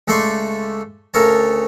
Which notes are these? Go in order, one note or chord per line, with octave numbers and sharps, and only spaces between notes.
C#2 A3 A4 D5 C6 C#6
D2 C#3 A4 A#4 C#5 A5